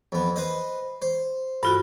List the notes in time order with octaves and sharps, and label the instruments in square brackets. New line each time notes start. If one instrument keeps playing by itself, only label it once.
[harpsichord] F2 B3
B4 C5 D#5
C5
[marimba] G2 F4 F#4 [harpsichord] A4